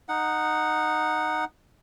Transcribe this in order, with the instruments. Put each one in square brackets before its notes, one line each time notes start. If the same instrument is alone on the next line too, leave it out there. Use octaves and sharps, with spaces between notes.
[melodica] D#4 F#5